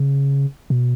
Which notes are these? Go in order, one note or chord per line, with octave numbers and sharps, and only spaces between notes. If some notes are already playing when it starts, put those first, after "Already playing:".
Already playing: C#3
B2